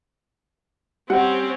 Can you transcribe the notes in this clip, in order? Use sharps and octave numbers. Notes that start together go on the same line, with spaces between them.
G3 C4 C#4 F#5